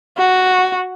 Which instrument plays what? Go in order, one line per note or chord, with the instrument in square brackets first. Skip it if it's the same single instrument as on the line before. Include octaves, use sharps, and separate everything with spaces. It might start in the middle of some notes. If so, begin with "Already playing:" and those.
[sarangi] F#4